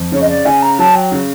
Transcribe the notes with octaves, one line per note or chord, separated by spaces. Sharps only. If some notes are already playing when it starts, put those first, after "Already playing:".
Already playing: F2
C#3 C#5
D#5
D5
C#3 G#5
A#5
F#3 A5
G5
C#3